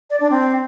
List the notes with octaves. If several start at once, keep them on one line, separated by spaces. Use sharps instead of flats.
D5
D4
C4